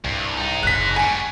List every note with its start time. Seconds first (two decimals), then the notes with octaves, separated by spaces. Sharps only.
0.04 C2 G2
0.38 D#4 G#4
0.63 F#1 F#6 B6
0.96 G3 F#4 G#5